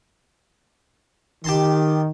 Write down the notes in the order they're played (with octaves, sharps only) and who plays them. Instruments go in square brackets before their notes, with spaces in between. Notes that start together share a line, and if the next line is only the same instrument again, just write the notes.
[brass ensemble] D#3 [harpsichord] G4 A5 C6